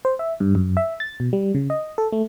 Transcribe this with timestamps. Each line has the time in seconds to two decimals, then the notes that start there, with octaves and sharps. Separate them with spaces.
0.05 C5
0.19 E5
0.40 G2
0.55 F#2
0.77 E5
1.00 A6
1.20 B2
1.33 G3
1.55 C#3
1.70 D#5
1.98 A4
2.12 A3